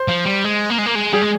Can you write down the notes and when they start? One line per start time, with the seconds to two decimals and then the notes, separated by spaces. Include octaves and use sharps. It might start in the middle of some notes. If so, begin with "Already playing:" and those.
Already playing: C5
0.08 F3
0.26 G3
0.44 G#3
0.70 A#3
0.78 G#3
0.86 A#3
0.95 G#3
1.13 G3 G#4
1.22 G#3